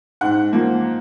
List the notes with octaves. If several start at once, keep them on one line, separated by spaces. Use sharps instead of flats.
G#2 F#5
F3 A#3